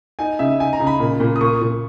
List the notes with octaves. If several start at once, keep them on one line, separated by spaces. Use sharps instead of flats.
D#4 G#5
C#3 E5
D#4 G#5
A#5
C#3
B5
A#2
A#2
D#6
A#2 C#6
A#2